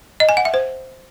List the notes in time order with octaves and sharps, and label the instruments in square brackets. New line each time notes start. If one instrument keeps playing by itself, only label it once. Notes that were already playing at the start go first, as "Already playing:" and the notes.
[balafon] D#5
G#5
F#5
E5
C5